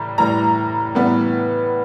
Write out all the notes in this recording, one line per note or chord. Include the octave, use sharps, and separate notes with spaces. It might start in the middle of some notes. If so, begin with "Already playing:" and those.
Already playing: A2 E3 G3 A#5
A2 E3 G3 A#5
A2 E3 G3 B3